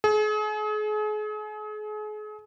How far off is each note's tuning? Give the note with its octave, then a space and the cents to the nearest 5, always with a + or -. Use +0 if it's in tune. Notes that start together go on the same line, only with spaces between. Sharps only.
G#4 +40